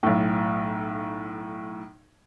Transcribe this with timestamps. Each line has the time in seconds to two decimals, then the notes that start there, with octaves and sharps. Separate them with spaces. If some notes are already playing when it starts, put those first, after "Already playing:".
0.03 B1 A2